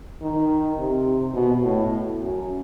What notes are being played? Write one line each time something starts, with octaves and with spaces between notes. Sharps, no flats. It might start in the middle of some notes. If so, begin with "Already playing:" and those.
D#3
C3
B2
A2
F#2